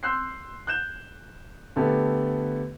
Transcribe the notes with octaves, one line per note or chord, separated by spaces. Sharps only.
C6 E6 F#6 G6 C7
F#6 G6 E7
D3 A3 B3 G4 A4